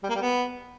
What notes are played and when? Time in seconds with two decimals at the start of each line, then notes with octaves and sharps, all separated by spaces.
0.03 G3
0.09 A#3
0.15 G3
0.21 B3